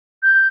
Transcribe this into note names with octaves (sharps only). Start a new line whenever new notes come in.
G6